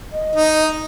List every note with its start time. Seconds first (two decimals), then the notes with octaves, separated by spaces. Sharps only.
0.12 D#5
0.35 D#4